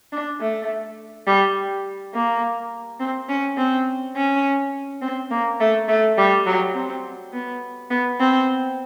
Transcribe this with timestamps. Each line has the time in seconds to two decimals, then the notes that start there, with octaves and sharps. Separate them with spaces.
0.12 D4
0.40 A3
1.27 G3
2.14 A#3
3.00 C4
3.29 C#4
3.57 C4
4.16 C#4
5.02 C4
5.31 A#3
5.60 A3
5.88 A3
6.18 G3
6.46 F#3
6.75 C4
7.33 B3
7.90 B3
8.20 C4